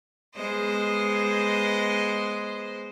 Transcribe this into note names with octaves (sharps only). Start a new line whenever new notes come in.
G#3 B3 C5 D#5